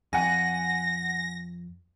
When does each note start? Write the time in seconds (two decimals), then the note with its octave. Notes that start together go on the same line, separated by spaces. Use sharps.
0.13 F2 F#5 G#5 A#6